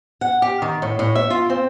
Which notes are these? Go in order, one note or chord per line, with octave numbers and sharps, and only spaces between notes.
F#5
G4
D#3
A2
A2
E5
F4
C4